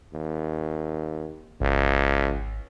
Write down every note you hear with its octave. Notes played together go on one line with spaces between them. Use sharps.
D#2
G#1 C#2